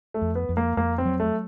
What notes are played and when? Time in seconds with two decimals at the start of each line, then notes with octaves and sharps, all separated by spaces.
0.14 A3
0.22 F2
0.35 B3
0.49 F2
0.57 A#3
0.77 F2 A#3
0.98 C4
1.05 F#3
1.20 A3